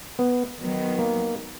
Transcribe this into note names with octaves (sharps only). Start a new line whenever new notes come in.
B3
D#3 F#3 B3
A#3